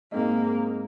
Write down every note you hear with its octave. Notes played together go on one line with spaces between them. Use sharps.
G#2 G#3 A#3 C4 G#4 D#5